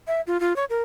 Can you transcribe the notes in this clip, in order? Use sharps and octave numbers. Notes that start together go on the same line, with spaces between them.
E5
F4
F4
C#5
A#4